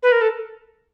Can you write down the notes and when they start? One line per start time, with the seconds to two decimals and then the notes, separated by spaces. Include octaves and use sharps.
0.03 B4
0.12 A#4
0.21 A4